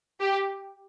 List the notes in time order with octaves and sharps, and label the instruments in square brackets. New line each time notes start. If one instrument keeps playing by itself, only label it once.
[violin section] G4